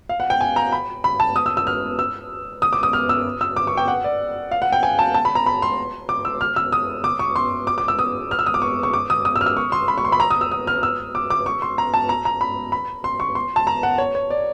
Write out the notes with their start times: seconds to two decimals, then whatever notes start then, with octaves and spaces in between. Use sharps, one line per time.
0.09 F5
0.20 F#5
0.30 G5
0.41 G#5
0.56 A#5
0.72 B5
1.04 B5
1.20 A5
1.36 D#6
1.46 E6
1.57 E6
1.67 F6
1.99 E6
2.62 D#6
2.73 D6
2.83 D#6
2.93 F6
3.09 E6
3.41 E6
3.57 D6
3.67 C#6
3.77 G5
3.88 F#5
4.04 D5
4.51 F5
4.62 F#5
4.72 G5
4.83 G#5
4.99 A5
5.14 A5
5.25 B5
5.35 A#5
5.46 B5
5.62 C6
6.09 D6
6.25 E6
6.41 F6
6.56 E6
6.72 D#6
7.04 D6
7.19 C#6
7.36 C6
7.67 D6
7.78 D6
7.88 E6
7.99 D#6
8.31 F6
8.39 E6
8.46 D#6
8.54 D6
8.62 C#6
8.83 C#6
8.93 D6
9.10 D#6
9.25 D#6
9.36 E6
9.41 F6
9.46 E6
9.57 C#6
9.72 C6
9.88 B5
9.98 C#6
10.05 C6
10.12 B5
10.20 A#5
10.31 D#6
10.41 E6
10.51 D#6
10.67 F6
10.83 E6
11.15 D6
11.30 D6
11.46 C#6
11.62 C6
11.78 A#5
11.94 A5
12.09 A#5
12.25 A#5
12.41 B5
12.72 B5
13.04 C6
13.20 C#6
13.35 C6
13.56 A5
13.67 A#5
13.83 F#5
13.98 C#5
14.15 C#5
14.30 D5